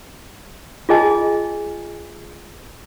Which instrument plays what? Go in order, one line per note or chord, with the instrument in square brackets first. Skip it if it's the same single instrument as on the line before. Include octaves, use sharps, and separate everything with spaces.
[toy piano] F4 G#4 D#5 G#5 A5